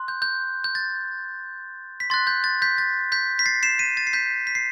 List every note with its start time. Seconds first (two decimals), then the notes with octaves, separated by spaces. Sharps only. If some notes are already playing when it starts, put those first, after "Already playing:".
Already playing: C6 F#6
0.08 G6
0.22 G6
0.64 G6
0.75 A6
2.00 B6
2.10 C6 F#6 A6
2.27 G6
2.44 A6
2.62 G6 B6
2.78 A6
3.12 G6 B6
3.39 B6
3.46 A6 C7
3.63 C7 E7
3.79 B6 D#7
3.97 A6
4.07 C7
4.13 G6 B6
4.47 B6
4.55 C7